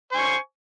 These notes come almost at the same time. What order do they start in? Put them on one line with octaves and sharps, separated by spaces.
C5 G#5 C#6